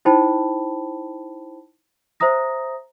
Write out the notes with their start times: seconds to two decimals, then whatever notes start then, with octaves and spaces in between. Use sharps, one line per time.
0.05 D#4 E4 C5 G5 A5 B5
2.20 C5 E5 A#5 D#6 A#6